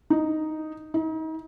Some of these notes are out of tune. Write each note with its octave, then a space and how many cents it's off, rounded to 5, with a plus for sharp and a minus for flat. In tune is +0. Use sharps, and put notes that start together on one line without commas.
D#4 +0
D#4 +35